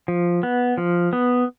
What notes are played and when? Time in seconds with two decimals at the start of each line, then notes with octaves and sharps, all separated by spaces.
0.08 F3
0.43 B3
0.78 F3
1.13 B3